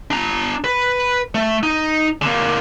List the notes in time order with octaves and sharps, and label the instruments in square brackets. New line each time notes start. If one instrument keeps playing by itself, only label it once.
[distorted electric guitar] D4 A#5
B4
A3
D#4
D3 A#3